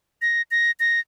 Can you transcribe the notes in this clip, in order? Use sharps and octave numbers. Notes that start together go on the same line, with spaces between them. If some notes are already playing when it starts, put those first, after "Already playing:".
A#6
A#6
A#6